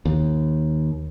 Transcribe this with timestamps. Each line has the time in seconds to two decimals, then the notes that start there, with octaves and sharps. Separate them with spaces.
0.05 D#2